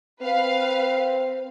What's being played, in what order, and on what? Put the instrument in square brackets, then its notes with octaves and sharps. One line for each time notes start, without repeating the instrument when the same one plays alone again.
[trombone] C4 [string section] B4 F5